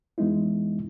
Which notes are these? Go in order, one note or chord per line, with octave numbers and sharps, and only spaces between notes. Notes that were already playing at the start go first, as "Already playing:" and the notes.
F2 E3 G#3 B3 D#4 E4